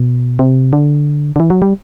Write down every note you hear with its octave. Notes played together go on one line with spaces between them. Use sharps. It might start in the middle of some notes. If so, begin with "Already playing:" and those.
Already playing: B2
C3
D3
D3
E3
F#3
G3